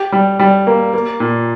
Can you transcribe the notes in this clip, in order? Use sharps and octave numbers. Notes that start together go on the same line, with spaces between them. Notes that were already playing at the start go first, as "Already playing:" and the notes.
Already playing: G4
G3
G3
A#3
A#3
A#2